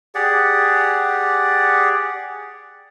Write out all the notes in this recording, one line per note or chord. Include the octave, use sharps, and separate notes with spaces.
G4 G#4 D5 F#5